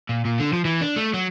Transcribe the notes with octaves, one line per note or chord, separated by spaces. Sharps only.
A#2
A#2
D3
F3
E3
D4
A3
F#3